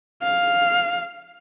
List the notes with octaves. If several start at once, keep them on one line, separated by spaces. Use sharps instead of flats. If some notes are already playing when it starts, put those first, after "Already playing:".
F5